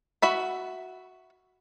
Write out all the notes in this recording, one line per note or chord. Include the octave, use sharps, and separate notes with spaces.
F#4 E5 B5